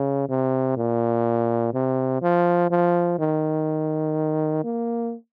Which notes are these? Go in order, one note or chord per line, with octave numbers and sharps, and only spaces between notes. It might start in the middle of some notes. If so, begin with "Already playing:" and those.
Already playing: C#3
C3
A#2
C3
F3
F3
D#3
A#3